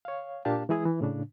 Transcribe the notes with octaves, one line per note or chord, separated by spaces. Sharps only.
C#5 F5
A#2 A#3 D4 G4 F5 A5
E3 G#3 E4 G#4 D#6
E3
A2 C#3 D4